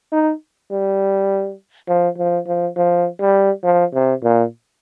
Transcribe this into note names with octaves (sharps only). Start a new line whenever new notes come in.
D#4
G3
F3
F3
F3
F3
G3
F3
C3
A#2